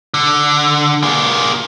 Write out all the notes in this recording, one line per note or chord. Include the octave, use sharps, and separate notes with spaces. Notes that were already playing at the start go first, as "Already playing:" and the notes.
D3
A#3 G#4